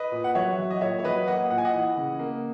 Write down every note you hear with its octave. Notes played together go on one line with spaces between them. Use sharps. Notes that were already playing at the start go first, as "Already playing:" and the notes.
Already playing: B4 D#5
A#2
F#5
F#3 C#5 E5
F#3
D#5
A#2 C#5 E5
C#5
F#3 B4 D#5
A#3 D#5 F#5
A#2 F#5
G#5
D#5 F#5
E3
C#3
A#3